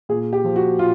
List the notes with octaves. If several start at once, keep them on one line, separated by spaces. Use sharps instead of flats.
A#2 G#4
G4
F3
F#4
A#2 F4